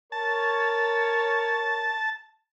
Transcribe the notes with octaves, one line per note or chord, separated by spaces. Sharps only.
A#4 C#5 A5